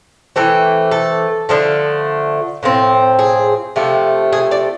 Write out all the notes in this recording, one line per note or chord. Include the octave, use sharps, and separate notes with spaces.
E3 A3 C4
A4
D3 F3 A3
A2 F3 A3 C4
G#4
C3 F3 A3
G#4
D5